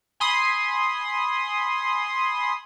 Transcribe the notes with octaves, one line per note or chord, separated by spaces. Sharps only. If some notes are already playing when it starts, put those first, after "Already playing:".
G#5 B5 C6 D#6